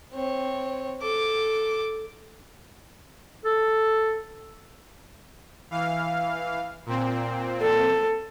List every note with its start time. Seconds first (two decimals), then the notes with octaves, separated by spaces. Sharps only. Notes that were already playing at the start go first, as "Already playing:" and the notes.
0.13 C4 C#5
1.01 A4 D6
3.45 A4
5.71 E3 F5
6.86 A#2 C4
7.61 A4